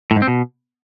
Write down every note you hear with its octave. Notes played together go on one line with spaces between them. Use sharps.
A2
G#2
C4
B2